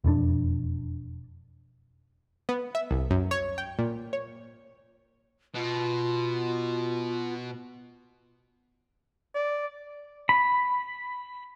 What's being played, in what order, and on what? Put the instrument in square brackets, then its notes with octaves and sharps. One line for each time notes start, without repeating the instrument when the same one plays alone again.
[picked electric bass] E1 F2 F3 D4
[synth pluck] B3
E5
C2
F#2
C#5
G5
A#2
C#5
[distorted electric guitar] B2 [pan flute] F4
[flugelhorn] D5
[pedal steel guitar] B5